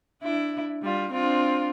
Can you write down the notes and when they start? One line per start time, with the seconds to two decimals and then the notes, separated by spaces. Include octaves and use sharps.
0.22 D4 E4
0.82 G3 F4
1.11 C4 D4 F4